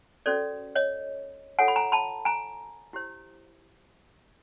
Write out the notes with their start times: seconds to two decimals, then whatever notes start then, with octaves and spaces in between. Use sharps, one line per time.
0.26 C#4 F#4 A4 C5 D5
0.75 C#5 D#5
1.59 F4 A4 C#5 F#5 G#5
1.68 B5
1.76 G#5 A#5
1.92 A5 B5
2.25 G#5 A#5
2.93 E4 G4 C5